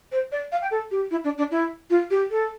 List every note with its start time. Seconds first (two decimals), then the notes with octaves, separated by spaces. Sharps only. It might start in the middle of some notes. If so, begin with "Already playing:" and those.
0.12 C5
0.32 D5
0.52 F5
0.62 G5
0.71 A4
0.91 G4
1.11 E4
1.24 D4
1.38 D4
1.51 E4
1.90 F4
2.11 G4
2.31 A4